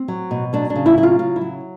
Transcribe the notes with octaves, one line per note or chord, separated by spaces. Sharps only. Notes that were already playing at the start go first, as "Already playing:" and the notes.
Already playing: C4
F#3
B2
F#3 D4
D4
C#3
E4
F#3 E4
F4
C#3 F4
E4
F#3